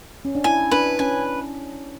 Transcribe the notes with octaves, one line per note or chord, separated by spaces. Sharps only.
C#4
D4
E4 G#5
D4 B4
C#4 G#5